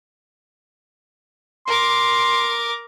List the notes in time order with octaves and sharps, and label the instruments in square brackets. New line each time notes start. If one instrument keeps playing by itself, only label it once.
[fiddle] A#4 D6 [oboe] C6